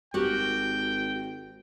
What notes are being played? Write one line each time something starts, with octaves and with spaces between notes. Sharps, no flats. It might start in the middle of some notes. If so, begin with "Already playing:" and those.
G#1 F#4 G4 A#4 G5